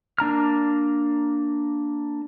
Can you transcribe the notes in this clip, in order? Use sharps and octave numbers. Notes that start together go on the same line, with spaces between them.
A#3 D4 A#5 F6